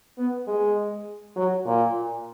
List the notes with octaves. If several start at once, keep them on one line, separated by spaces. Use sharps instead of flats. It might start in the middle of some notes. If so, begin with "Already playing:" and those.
B3
G#3
F#3
A#2